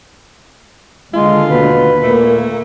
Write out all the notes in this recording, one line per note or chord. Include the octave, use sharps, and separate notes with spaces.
D#2 D3 G#3 F4
B2 B4
A#2 A3 A#3